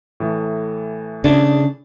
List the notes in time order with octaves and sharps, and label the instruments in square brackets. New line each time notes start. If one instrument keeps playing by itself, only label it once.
[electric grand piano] A2 E3 A3
[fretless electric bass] C#3 [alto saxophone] D4